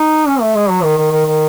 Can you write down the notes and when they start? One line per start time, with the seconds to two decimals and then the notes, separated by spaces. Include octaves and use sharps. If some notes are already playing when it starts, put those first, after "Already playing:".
Already playing: D#4
0.27 C#4
0.41 A3
0.55 G#3
0.69 F#3
0.83 D#3
0.98 D#3
1.11 D#3
1.25 D#3